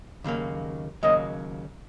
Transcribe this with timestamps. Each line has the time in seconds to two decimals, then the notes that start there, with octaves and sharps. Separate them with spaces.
0.24 D#2 C#3 F#3 A#3
1.03 D#2 C#3 F#3 A#3 D#5